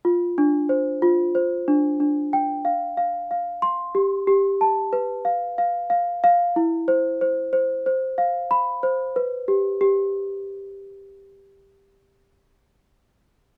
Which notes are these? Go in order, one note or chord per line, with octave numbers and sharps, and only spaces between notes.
F4
D4
C5
F4
C5
D4
D4
G5
F5
F5
F5
C6
G4
G4
A5
B4
F5
F5
F5
F5
E4
C5
C5
C5
C5
F5
B5
C5
B4
G4
G4